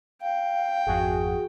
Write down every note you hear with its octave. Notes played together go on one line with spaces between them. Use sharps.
F5 G5
G#1 F2 F#4 G#4